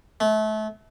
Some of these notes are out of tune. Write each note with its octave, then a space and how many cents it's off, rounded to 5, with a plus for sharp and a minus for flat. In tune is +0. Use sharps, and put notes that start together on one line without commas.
A3 -30